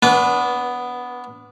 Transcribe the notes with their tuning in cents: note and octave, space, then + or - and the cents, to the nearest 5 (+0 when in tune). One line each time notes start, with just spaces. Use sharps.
B3 +0 D4 -30 B4 -20